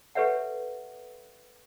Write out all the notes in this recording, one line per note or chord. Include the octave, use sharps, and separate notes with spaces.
G4 A4 B4 C#5 E5 F#5